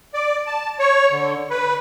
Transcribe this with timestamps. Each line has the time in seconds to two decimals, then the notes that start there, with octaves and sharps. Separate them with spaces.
0.14 D5
0.47 A5
0.79 C#5
1.12 D3
1.50 B4